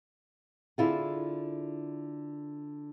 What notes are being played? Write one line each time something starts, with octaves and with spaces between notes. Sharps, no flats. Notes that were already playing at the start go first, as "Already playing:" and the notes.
D3 E4 F4 G#4